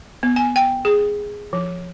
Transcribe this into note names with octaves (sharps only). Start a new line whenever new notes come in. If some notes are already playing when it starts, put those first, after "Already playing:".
B3
G#5
G5
G#4
F3